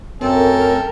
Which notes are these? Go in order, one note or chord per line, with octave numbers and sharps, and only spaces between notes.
F#2 A3 C4 A4 A#4 G5